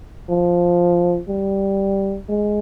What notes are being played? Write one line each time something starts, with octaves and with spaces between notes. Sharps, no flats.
F3
G3
G#3